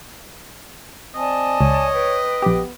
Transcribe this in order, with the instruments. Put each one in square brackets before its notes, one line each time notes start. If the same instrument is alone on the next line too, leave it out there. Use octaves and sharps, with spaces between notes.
[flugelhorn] C4 [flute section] D5 G#5 A5 [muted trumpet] D#5
[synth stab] C#2 [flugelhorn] C#5
[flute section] B4 G5
[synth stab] A#1 G4 [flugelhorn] B3